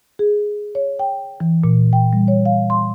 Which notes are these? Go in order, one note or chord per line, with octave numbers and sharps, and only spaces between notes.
G#4
C#5
G5
E3
A#2
G5
G3
C#5
F5
C6